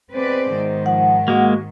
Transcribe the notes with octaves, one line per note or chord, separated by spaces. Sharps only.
G#3 B3 C4 B4 C5 D5
G#2 D#3
F3 F#5
G#3 A#3 F#4